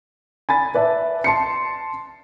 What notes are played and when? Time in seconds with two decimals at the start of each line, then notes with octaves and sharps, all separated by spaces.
0.49 G#5 B5 A6
0.75 B4 D5 E5 A5
1.24 A5 C6 C7 C#7